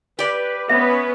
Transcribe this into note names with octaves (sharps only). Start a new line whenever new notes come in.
G4 B4 D5
B3 C#4 B4 E5